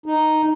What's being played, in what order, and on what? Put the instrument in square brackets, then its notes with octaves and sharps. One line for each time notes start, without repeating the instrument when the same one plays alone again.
[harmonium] D#4